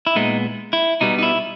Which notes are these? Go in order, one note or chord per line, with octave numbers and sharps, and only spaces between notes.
E4
A#2 G#3 B3 D#4
E4
B2 G3 B3 D#4
D#4
E4